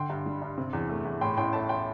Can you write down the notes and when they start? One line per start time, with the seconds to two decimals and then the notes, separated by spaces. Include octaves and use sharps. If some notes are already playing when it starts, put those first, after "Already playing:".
Already playing: D3 G5 C6
0.10 G2
0.26 G3
0.42 G2
0.58 C3
0.73 E2
0.89 A3
1.05 E2
1.21 A2 G5 C6
1.37 A1 G5 C6
1.53 A3 E5 A5
1.69 G5 C6